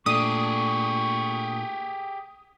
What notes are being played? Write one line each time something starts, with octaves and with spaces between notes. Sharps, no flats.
A#2 A3 D4 G4 G#4 C#6 D#6